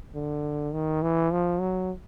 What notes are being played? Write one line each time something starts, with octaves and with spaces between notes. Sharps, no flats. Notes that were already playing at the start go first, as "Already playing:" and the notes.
D3
D#3
E3
F3
F#3